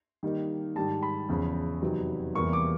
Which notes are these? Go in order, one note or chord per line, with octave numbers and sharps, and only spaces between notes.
D#3 G3 A#3 D#4
G#2 D#3 G3 A5
B5
E2 C#3 F3
F2 C3 D#3 F#3 B3
E2 C3 E3 G3 A#3 C#6
D6